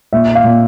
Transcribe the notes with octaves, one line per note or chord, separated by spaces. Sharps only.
A#2 E5
F5
A#2